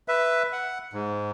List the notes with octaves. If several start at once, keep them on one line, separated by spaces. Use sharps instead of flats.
B4 E5
F#5
G#2